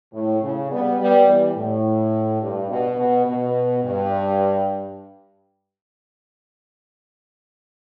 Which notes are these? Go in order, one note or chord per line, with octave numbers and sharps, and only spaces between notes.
A2
C#3
G3 B3
G3 B3
E3 G3
A2
G2
B2
B2
B2
G2